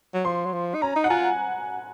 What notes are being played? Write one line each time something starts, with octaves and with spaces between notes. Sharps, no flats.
F#3
F3 C6
F#3
F3
D#4
C#4 A#5
D#4
F#5
F4 G#5